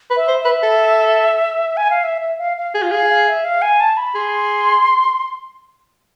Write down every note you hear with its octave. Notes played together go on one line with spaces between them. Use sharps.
B4
E5
C5
E5
B4
A4
G#5
F5
E5
E5
F5
F5
G#4
F4
G#4 F5
F5
E5
F5
G#5
A5
B5
G#4 C6